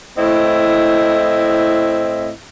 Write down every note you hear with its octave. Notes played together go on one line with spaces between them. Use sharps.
A2 C4 E4 D#5